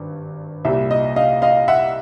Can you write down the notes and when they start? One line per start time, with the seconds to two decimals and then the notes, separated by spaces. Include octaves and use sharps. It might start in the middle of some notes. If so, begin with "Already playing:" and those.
Already playing: G#1 G2
0.65 C2 A#2 G3 E5
0.91 D#5
1.16 D#5 F5
1.42 D#5 F5
1.68 E5 F#5